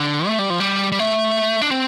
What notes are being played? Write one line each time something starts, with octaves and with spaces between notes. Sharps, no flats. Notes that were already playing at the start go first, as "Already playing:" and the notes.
Already playing: D3
A3
G3
F3
G3
G3
A3
D4
C4